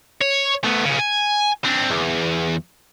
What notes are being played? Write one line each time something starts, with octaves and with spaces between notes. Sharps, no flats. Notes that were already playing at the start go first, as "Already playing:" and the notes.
C#5
A3 B3
B1 C#3
G#5
C4 D4
E2